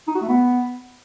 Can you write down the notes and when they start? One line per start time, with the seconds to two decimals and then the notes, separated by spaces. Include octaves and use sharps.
0.08 D#4
0.15 F#4
0.22 A3
0.28 B3